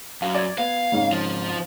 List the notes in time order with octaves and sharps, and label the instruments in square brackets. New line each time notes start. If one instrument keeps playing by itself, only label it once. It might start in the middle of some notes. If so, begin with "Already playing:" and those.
[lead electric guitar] F#2 [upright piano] F5
[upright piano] D5 G#6
[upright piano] B3 [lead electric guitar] F5
[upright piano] G#1 G#2 C#3
[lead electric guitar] F3 F4